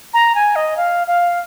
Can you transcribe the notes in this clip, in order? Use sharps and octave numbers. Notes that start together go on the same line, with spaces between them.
A#5
G#5
D#5
F5
F5